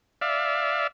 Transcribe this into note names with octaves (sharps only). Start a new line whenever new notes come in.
D5 E5 F5